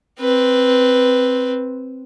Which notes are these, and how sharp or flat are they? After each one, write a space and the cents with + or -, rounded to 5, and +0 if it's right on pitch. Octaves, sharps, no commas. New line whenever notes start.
C4 +0 B4 +0